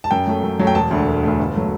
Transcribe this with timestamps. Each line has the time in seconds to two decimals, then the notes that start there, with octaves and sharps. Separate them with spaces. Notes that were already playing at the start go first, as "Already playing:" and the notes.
0.04 A5
0.11 F#2 G5
0.27 F#3 A3
0.43 F#2
0.59 F#3 A3
0.67 G5
0.75 E1 A5
0.91 D2 D3 A3
1.07 E1
1.23 D2 D3 A3
1.39 G1
1.56 F#3 A3